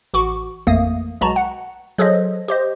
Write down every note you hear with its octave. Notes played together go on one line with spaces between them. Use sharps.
A1 F#4 C#6 D6
A1 F2 A3 A#3 D#6
B1 G#3 F#4 A5 A#5
F#5
F#3 G#4 A4 C5 D#5
G4 C5 D#5